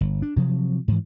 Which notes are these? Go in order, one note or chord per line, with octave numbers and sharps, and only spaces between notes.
G1
D4
C3 F3 F#3
G#2 E3